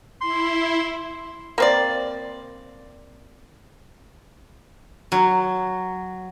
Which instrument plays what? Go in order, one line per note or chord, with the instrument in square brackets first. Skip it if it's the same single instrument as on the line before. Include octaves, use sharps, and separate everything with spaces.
[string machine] E4 [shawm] C6
[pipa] A#3 C4 D5
[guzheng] F#3